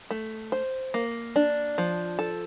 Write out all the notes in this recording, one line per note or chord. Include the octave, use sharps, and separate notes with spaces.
A3
C5
A#3
D4
F3
A4